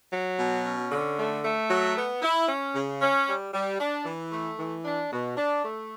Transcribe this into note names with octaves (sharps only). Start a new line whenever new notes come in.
F#3
B2
C#4
D3
A3
A3
F#3
B3
E4
C#4
C#3
C#4
G3
G3
D4
E3
A3
E3
D4
B2
D4
A3